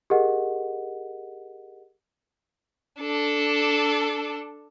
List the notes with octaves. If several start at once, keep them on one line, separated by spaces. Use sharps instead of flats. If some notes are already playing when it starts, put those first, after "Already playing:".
G4 G#4 A#4 D#5 F#5
D4 A4